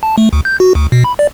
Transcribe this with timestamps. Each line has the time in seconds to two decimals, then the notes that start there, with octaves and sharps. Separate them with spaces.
0.03 A5
0.18 A3
0.33 D2
0.45 G6
0.60 F#4
0.75 D2
0.92 B2
1.04 B5
1.19 D5